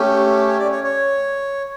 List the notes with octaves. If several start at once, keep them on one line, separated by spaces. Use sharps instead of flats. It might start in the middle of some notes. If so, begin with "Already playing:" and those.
Already playing: A3 C#4 G4
C#5
D5
C#5
C#5